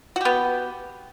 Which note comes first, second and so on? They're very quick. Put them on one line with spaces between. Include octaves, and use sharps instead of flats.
F#4 G4 B3